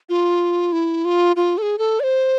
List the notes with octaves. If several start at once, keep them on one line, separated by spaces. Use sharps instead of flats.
F4
E4
F4
F4
A4
G#4
A4
D5
C5